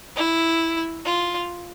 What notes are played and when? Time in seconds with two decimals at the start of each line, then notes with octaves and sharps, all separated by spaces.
0.16 E4
1.05 F4